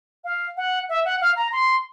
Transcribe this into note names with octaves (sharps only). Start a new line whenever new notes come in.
F5
F#5
E5
F#5
F5
A#5
C6